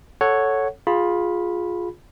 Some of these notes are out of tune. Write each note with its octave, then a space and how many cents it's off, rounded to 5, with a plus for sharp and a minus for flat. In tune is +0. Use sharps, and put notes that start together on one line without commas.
A4 +0 C#5 +0 F#5 +0
F4 +15 G#4 +0 B5 -5